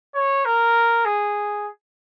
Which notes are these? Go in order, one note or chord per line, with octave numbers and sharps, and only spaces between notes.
C#5
A#4
G#4